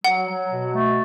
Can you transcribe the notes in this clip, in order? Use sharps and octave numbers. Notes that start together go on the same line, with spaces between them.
F#3 F#5
F#3
B2
A3